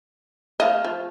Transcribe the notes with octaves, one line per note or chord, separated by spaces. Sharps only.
A3 D#5 F5
F3